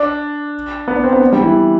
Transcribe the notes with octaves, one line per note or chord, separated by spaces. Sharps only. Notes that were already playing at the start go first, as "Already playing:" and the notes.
Already playing: D4
B3
D4
C4
B3
G3
E3